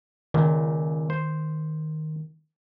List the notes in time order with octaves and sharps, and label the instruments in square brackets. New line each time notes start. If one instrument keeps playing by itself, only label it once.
[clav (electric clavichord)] C#2 A#2 [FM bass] D#3
[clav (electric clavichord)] C5